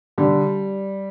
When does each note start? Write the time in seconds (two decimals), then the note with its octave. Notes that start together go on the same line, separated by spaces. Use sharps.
0.18 D3 G3